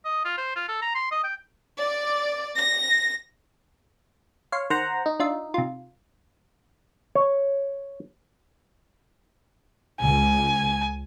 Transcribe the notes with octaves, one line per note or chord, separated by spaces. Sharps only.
D#5
F4
C5
F4
A4
A#5
C6
D#5
G5
D5
A#6
C#5 F5 C6
D#3 C5 F#5 A#5
D#4
D4 F4 E5
C3 F4
C#5
C#2 G#5